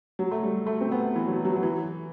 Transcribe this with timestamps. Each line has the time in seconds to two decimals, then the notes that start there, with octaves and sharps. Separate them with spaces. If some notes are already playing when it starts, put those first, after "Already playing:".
0.19 F#3
0.31 A3
0.43 G3
0.67 A3
0.81 C4
0.92 B3
1.15 E3
1.27 F#3
1.45 F#3
1.56 F#3
1.63 E3